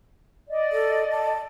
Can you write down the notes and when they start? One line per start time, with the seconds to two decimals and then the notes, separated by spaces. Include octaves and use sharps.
0.49 D5 D#5
0.72 A4
1.11 A5